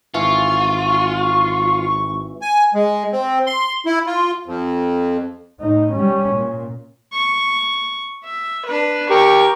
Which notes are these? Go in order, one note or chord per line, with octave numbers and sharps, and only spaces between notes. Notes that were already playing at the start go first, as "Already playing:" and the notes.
G#1 E3 F4 C#6
G#5
G#3
C4
C6
E4
F4
F2
A2 D#4
G3 C#4
A#2
C#6
E5
D4 B4
G4 A#4 C#6